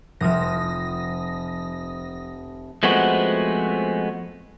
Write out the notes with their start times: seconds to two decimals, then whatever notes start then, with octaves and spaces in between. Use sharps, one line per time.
0.21 F1 F3 D#6 A#6
2.83 F3 G#3 A3 B3 C4 F#4